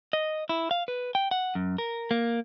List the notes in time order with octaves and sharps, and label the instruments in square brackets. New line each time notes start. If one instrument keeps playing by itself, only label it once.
[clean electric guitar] D#5
E4
F5
B4
G5
F#5
F#2
A#4
A#3